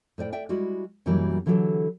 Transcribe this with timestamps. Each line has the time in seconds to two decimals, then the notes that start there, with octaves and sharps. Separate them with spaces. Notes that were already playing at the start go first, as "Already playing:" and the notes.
0.18 A2 C5 D5 G5
0.33 D5 E5 G5
0.49 G3 G#3 E4 F#4
1.06 F#2 B2 E3 F#3 G3 A#3
1.46 D3 E3 F#3 G4 A4